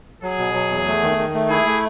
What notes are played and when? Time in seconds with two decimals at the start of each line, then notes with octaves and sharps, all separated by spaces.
0.23 F#3 G#4
0.38 B2
0.54 F#3
0.70 E2
0.87 A3
1.02 D#3
1.18 D#3
1.34 A3
1.49 E4 G#4
1.66 A3